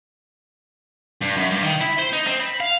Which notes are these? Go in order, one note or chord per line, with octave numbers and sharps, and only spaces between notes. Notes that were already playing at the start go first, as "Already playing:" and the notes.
G2
F#2
G2
D#3
E4
C5
D#4
C4
B5
F5